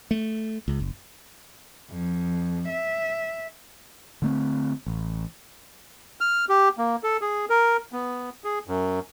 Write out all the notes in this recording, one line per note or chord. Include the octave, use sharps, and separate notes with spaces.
A3
C#2
F#1
F2
E5
D3 A3 C4
A1
F6
G4
A#3
A4
G#4
A#4
B3
G#4
F#2